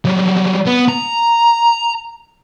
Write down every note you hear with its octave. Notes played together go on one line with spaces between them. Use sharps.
F#3 G3
B3
A#5